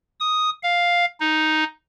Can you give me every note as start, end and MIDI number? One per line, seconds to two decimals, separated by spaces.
0.20 0.50 87
0.63 1.05 77
1.20 1.64 63